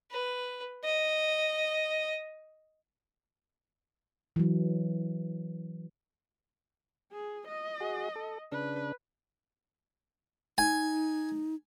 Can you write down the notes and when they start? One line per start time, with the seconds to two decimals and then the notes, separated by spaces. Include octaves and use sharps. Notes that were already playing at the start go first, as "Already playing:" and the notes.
0.11 B4
0.84 D#5
4.36 E3 F#3
7.12 G#4
7.48 D#5
7.80 F#4 G#4
8.16 A4
8.52 C#3 D4 B4
10.58 D#4 G#5